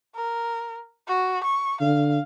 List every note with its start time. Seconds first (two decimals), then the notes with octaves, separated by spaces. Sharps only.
0.15 A#4
1.08 F#4
1.44 C#6
1.81 D3 F5